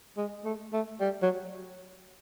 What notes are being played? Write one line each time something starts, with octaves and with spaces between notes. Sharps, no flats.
G#3
A3
A3
G3
F#3